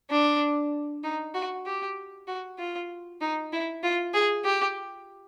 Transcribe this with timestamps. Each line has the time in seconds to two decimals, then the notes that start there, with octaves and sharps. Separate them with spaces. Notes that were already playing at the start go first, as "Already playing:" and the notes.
0.10 D4
1.04 D#4
1.34 F#4
1.66 G4
2.28 F#4
2.59 F4
3.21 D#4
3.53 E4
3.83 F4
4.14 G#4
4.45 G4